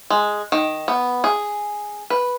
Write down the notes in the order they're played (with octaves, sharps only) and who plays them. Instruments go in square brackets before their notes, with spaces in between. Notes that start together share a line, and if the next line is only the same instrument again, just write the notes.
[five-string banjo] G#3
D#3
B3
G#4
B4